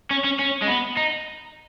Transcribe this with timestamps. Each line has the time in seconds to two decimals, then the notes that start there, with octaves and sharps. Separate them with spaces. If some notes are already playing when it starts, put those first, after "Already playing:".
0.11 C#4
0.25 C#4
0.39 C#4
0.62 G#3
0.68 B3
0.97 D#4